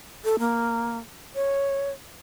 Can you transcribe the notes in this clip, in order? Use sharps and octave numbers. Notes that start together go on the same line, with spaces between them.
A4
A#3
C#5